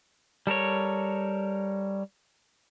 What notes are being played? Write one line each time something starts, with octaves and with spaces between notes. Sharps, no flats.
G3 A4 A#4 C#5